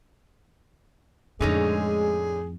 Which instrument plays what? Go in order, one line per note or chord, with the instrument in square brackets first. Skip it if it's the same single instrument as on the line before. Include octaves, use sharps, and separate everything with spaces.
[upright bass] F2 A2 [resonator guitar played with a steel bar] D3 C#4 D#4 [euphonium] G#3 [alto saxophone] G#4